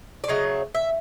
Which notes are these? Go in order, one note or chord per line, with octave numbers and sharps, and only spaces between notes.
D5
C#3 F#3 A3 D#5
E5